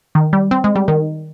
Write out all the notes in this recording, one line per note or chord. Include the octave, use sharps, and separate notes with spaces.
D#3
G3
C4
G#3
G3
D#3